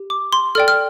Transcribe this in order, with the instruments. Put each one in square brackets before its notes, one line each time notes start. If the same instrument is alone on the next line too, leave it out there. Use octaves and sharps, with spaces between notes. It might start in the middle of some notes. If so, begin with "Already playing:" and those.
Already playing: [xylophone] G4
D6
C6
A4 D5 G5 F6
F6